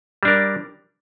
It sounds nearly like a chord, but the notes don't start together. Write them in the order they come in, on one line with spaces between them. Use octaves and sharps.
G3 D4 A#4